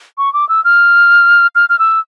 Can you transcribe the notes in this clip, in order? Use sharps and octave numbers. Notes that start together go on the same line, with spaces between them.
C#6
D6
E6
F6
F6
F6
E6